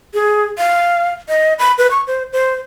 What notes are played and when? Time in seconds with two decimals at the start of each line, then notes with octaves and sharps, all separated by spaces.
0.14 G#4
0.58 F5
1.28 D#5
1.59 B5
1.78 B4
1.91 C#6
2.07 C5
2.33 C5